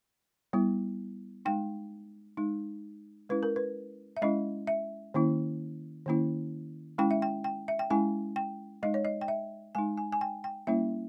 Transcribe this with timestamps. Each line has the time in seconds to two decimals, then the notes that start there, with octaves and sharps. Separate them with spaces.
0.53 G3 B3 E4
1.45 G#3 D#4 G5
2.37 G#3 D#4
3.29 G#3 C#4 E4 B4
3.43 A#4
3.56 B4
4.17 E5
4.22 G#3 C#4 E4 D#5
4.67 E5
5.14 D#3 A#3 C#4 E4
6.06 D#3 A#3 C#4 E4
6.98 G#3 C#4 E4 G5
7.11 E5
7.22 G5
7.44 G5
7.68 E5
7.79 G5
7.90 G#3 C#4 E4 G#5
8.36 G5
8.83 G#3 D#4 D#5
8.94 C#5
9.05 D#5
9.21 G5
9.28 E5
9.75 G#3 D#4 G#5
9.97 G#5
10.12 G#5
10.21 G5
10.44 G5
10.67 G3 A#3 C#4 E4 E5